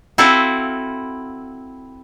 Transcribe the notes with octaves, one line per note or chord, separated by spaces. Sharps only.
C4 E4 F#4 A4 F5